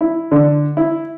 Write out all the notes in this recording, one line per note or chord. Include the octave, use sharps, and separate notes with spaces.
E4
D3
E4